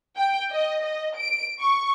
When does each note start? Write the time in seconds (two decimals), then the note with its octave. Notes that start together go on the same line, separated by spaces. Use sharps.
0.16 G5
0.51 D#5
0.84 D#5
1.16 D7
1.61 C#6